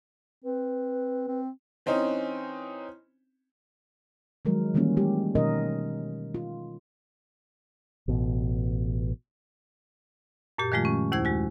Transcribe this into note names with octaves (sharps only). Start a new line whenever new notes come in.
C4 B4
C4
E3 C4 C#4 D#4
D#3 F3 F#3 G#3 A#4
D#3 E3 G3 A#3 C#4 F4
G3 G#3 G4
B2 D#3 C#4 D#4 A#4 D#5
F4
A1 B2
F#2 A#2 G4
D#3 F3 G#3 A3 F4
C#4
D#2 E4 C5 G#6
G#3 F#4